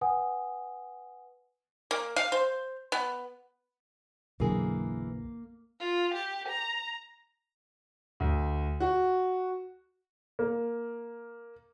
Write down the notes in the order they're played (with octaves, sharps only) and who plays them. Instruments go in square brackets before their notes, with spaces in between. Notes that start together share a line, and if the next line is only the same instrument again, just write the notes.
[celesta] B4 F#5 G#5 D#6
[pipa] A#3
F5
C5
B3
[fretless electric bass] B1 F#2 D3 [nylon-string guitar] E3 G#4 [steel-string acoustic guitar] A#3
[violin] F4
G4
A#5
[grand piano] D2
F#4
[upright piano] A#3